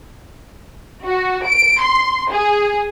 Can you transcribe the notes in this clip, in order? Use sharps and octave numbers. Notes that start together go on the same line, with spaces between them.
F#4
D7
C6
G#4